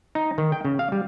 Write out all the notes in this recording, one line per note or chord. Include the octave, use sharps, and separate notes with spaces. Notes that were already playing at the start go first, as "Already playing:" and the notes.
D#4
D#3
G5
C#3
F5
G3